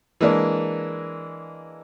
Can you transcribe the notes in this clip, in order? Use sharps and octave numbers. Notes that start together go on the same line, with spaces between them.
E3 G#3 A#3 D4